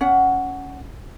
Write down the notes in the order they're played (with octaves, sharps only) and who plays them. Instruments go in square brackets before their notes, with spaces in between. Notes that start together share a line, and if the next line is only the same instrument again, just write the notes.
[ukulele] C#4 F#5